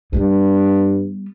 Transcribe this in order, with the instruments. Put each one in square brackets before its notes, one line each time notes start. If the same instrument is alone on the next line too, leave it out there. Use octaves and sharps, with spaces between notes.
[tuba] G2 [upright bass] G3 B3